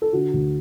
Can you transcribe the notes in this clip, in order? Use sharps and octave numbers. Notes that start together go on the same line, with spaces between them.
A4
D3 F#4
D2